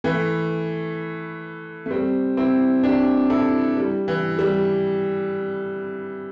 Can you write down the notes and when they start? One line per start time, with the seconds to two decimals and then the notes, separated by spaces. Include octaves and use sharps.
0.04 E3 A3
1.86 A3
1.91 G3 C4
2.37 C4 E4
2.83 D4 G4
3.30 E4 A4
3.77 G3
4.08 E3
4.39 G3